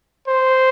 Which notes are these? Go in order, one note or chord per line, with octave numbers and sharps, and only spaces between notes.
C5